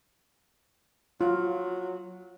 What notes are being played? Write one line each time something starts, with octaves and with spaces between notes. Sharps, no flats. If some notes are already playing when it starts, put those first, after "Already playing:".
F#3 F4